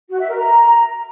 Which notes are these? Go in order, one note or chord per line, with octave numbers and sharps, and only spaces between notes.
F#4
E5
A#4
A#5